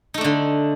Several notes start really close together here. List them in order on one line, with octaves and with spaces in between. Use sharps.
D#4 A3 D4 D3